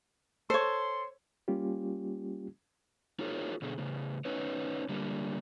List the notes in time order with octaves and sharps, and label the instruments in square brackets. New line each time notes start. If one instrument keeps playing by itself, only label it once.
[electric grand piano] A4 [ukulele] C5 C#5 [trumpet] C6
[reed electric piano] G3 A#3 C#4 F4 G4
[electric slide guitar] D#4 F4 F#4 G#4 A#4 C#5
B2 D3 G#4
A2 C#3
C#4 D#4 B4 C#5
D3 G3 A#3